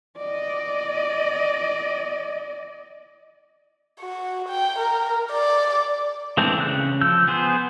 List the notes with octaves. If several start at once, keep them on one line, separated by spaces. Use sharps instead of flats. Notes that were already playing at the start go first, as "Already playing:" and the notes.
D5 D#5
F#4
G5
A#4
D5
E3 G#3 A3 C4 D4
C#3 F#6
F3 E6 G6
B3 G#4 C5